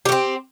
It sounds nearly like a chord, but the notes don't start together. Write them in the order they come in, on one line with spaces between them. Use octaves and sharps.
G4 A3 C4